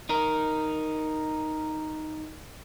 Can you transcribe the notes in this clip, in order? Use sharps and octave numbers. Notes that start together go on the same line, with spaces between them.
D#4 A#4